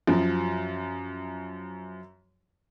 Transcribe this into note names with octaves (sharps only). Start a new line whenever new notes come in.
F#2 F3